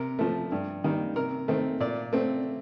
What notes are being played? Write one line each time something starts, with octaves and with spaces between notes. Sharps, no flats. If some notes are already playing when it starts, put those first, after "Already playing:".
Already playing: C3 A#4
F3 A3
G2
D#3 G3 A#3
C3 A#4
D#3 A3 C4
A#2 D5
A3 C4